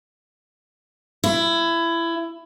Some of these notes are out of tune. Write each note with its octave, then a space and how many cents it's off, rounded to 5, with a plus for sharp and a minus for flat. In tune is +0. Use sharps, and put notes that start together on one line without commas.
E4 +20